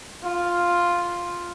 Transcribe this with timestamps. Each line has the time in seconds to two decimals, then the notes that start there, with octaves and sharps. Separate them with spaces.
0.23 F4